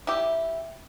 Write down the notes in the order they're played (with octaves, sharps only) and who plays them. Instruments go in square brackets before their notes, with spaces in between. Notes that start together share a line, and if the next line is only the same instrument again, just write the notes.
[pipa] E4 G4